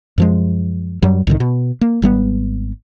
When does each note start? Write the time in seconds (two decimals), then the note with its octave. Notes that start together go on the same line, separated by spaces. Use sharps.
0.18 F#2 F3 G#3
1.02 F#2 F#3 G3
1.27 C2 A2 D3 D#3
1.40 B2
1.81 A#3
2.02 G#1 G3 B3